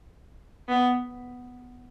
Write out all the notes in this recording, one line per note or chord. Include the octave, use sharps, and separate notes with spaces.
B3